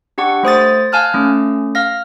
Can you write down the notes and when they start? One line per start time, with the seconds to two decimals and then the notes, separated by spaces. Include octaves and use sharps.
0.18 D4 G4 F#5 C#6
0.43 A3 C5 D#6 A6
0.92 F5 G#5 A5 F6 F#6
1.14 A3 C#4
1.75 F5 F6 A#6